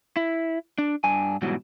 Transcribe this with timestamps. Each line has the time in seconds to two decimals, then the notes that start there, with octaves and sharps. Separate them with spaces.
0.17 E4
0.78 D4
1.04 G2 D4 G#5
1.42 G#2 B2 E3 F#3 G3